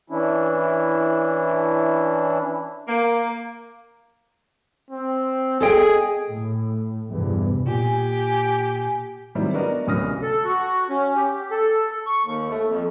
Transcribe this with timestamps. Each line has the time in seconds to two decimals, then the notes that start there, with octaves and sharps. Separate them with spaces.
0.10 E3 C#4 D4 E4
2.86 A#3
4.91 C4
5.61 G#4 A4 D#5 G5
6.30 A2
7.11 E2 G2 C3 E3
7.67 A#2 G4 G#5
9.35 D#3 F#3 G3 C4 E4
9.53 B3 D4 F#4 A#4 D5 D#5
9.87 D1 C2 C#4 D#6 F6 A#6
10.22 A4
10.44 F#4
10.89 C#4
11.16 G4
11.51 A4
12.06 C#6
12.24 D#2
12.50 A3
12.67 F2